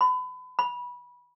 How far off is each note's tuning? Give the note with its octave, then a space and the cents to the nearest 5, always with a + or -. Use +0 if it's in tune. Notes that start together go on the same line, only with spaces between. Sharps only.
B5 +35
B5 -20